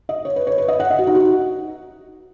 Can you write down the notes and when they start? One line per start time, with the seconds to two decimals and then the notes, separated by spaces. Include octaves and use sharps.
0.09 D#5
0.25 C#5
0.36 B4
0.47 C#5
0.58 B4
0.68 D#5
0.80 F#5
0.90 D#5
0.98 F#4
1.07 D#4
1.15 F#4